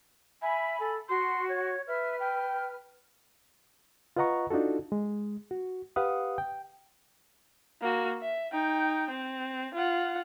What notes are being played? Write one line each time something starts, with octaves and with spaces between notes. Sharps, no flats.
E5 G#5 B5
A4
F#4 C6
C#5
B4 E5 F6
G5
F4 B4 D#5 F#5 A#5 C#6
D4 D#4 F4 F#4 A4
G#3
F#4
G4 B4 F5 F#5 D#6
G5
A#3 F#4
E5
D#4 G5
C4
F4 F#5